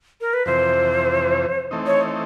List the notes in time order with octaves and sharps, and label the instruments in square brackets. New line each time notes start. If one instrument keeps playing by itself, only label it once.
[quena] A#4
B4
[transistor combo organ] F2 C3 E3 [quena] C5
[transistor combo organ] E3 A3 C4 D#4
[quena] C#5